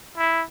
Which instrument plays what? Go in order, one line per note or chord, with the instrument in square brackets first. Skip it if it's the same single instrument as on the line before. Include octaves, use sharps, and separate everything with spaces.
[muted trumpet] E4